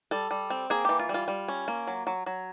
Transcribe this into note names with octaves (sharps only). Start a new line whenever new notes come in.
G3 A4
G3
C4
A#3 G#4
E3 G4
F4
G3
F4
G3
C#4
A#3
F#3
F#3
F#3